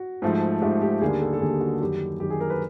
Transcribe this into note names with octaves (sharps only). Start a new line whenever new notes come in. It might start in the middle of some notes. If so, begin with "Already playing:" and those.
Already playing: F#4
G#2 F3 A3
G#2 F3 A3 G4
G4
D#2 D3 G3 A#3 G#4
A4
A4
D#2 D3 G3 A#3 G#4
F#4
F#2 D#3 G3 G4
F#2 D#3 G3 G4
G#4
A#4
B4